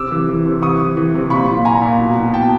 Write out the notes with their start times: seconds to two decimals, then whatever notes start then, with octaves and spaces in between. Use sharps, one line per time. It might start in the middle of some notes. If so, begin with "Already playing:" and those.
Already playing: C3 D6 E6
0.11 E3
0.28 E3
0.46 C3
0.62 E3 C#6 D#6
0.80 E3
0.97 E3
1.14 C3
1.30 A#2 B5 C#6
1.48 A#2
1.65 A#2 G#5 A#5
1.82 A#2
1.99 B2
2.17 B2
2.33 B2 G5 A5